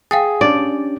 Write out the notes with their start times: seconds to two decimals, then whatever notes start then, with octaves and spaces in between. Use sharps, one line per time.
0.11 G#4 F5 G5 A6
0.41 C#4 D4 G4 D5